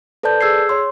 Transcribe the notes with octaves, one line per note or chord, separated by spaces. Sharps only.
A4 B4 C5 D5 A5 G6
G#4 E6 G#6 C7
C#5 C6